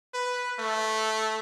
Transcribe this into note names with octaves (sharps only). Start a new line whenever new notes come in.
B4
A3